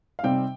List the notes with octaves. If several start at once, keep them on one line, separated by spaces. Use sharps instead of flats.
F5
C3 G3 C4 D#4 G5